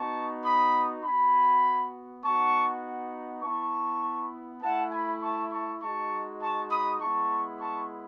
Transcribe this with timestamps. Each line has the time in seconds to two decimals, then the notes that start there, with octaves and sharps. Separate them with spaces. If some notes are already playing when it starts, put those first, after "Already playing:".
Already playing: B3 D#4 F#4 A5 C#6
0.44 B5 D#6
1.03 B3 F#4 G#5 B5
2.23 B3 D#4 F#4 A5 C#6
3.42 B3 E4 A5 C#6
4.61 A3 E4 F#5 A5
4.91 G#5 B5
5.22 A5 C#6
5.52 A5 C#6
5.81 G#3 D#4 F#4 A5 C#6
6.41 A5 C#6
6.70 B5 D#6
7.00 G#3 B3 E4 A5 C#6
7.59 A5 C#6